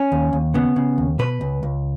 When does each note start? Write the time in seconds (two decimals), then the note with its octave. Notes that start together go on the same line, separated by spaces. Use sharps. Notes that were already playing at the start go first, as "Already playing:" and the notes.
Already playing: C#4
0.12 D#2
0.33 D#2
0.54 C#3 B3
0.76 C#3
0.98 D#2
1.19 B2 B4
1.41 C#2
1.63 C#2